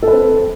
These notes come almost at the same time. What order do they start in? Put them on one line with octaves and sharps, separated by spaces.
A4 B4 C4